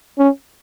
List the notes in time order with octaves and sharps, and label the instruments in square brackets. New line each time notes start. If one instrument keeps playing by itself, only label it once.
[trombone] C#4